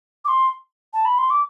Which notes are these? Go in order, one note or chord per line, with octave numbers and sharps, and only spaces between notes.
D6
C6
A5
B5
C6
D6